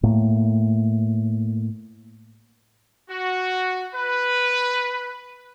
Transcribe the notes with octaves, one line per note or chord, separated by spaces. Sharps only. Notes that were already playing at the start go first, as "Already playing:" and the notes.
A2 A3 A#3
F#4
B4